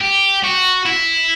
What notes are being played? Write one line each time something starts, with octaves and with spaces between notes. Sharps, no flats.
G4
F#4
E4